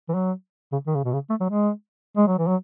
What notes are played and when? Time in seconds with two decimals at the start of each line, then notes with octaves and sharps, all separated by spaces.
0.09 E3
0.14 F#3
0.72 C#3
0.87 D#3
0.95 C#3
1.04 B2
1.13 C#3
1.30 A3
1.40 F#3
1.50 G#3
2.17 G#3
2.27 F#3
2.38 E3
2.48 F#3